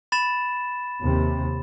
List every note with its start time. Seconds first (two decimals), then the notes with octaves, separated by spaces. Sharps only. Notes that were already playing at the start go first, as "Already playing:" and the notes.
0.12 B5 A6 E7
1.02 D#2 C3